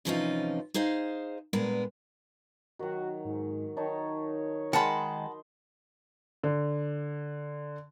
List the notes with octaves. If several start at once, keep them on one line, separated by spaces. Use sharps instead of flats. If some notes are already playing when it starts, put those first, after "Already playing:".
C3 E3 F3 C#4 D#4 F4
D#4 G#4 C5 F5
G2 A#2 G#3 B3 A#4 B4
D#3 F#3 F#4
G#2
D#3 D#4 C#5 A5
D#3 G#3 D#5 F#5 A5 B5 C6
D3